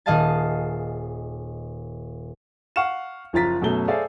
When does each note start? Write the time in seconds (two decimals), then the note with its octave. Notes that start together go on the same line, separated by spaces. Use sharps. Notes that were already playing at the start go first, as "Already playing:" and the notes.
0.06 D#1 G#4 D#5 F5 A5 A6
2.76 F5 F#5 C#6 F6 C#7 E7
3.33 F#1 F3 F4 A#5 A6 B6
3.61 F#2 B2 F#3 A3 G7
3.88 G#4 A4 C5 D5 E5 F5